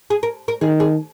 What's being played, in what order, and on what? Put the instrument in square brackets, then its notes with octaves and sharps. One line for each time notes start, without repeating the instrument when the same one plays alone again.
[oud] G#4
A#4
A#4
[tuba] D#3 [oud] G#4
[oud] G#4